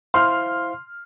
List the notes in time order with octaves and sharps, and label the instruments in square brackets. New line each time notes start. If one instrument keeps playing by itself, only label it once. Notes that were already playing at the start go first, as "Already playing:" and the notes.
[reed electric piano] E4 C5 F5 [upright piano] C6 F6